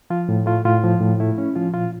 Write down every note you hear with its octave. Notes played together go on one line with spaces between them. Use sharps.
F3 F4
A2
A3 F4
A2 F4
F3
A2
A3 E4
C#4
F3 F4
A#2 F4